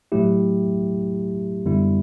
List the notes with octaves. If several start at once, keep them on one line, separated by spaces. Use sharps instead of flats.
A2 F#3 A3 E4 G4
F#2 D3 G3 B3 E4